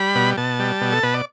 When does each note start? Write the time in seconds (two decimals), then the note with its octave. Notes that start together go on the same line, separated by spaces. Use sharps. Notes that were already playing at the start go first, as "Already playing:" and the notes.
Already playing: G3 B5
0.15 B2
0.37 B2 A5
0.59 G3
0.81 B2
0.92 A4
1.03 B2 B4
1.14 D5